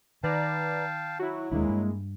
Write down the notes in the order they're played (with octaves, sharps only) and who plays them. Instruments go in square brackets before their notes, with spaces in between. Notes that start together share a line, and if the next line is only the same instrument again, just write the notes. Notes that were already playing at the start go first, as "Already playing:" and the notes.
[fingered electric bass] D#3 [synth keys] B4 D5 A#5 [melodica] F5 G5 A5
[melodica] F#3 [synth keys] E4 F#4
[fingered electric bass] E1 D#2 D4 [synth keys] G#3 A#3 E4
[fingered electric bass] G2